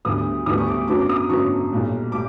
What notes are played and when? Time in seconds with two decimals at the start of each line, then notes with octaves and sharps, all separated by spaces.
0.05 D2 D3 G3 B3 D#6
0.46 D2 D3 G3 B3 D#6
0.58 C#6
0.67 D6
0.88 F#2 D3 F#3 B3 D6
0.99 D6
1.09 D#6
1.30 F#2 D3 F#3 B3 C#6
1.72 B1 A#2 G3
2.12 G3 D6